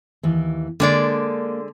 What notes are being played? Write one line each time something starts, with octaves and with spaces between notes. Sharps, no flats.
D#2 E3
D3 G#3 A#3 D5